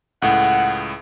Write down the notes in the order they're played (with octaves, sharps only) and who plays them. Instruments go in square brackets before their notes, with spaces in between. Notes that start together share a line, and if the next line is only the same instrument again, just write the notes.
[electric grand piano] C#2 A2 [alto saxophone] F#5